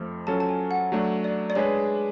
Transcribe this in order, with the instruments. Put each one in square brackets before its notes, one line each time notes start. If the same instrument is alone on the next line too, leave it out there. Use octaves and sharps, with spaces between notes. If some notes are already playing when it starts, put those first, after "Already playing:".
Already playing: [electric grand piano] F2 F3 A3
[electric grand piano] F#3 C#4 F4 A4 [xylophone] A5
[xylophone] A5
G#5
F#5
[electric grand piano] F#3 A3 D4
[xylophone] D5
D5
[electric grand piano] G#3 D4 G#4 B4 [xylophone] C#5